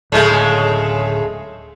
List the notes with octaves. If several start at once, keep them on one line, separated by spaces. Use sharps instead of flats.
D1 C#3 G#3 A3